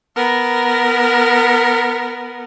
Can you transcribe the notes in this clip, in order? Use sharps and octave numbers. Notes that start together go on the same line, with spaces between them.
B3 A#4